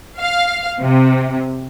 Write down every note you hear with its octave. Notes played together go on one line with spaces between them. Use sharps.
F5
C3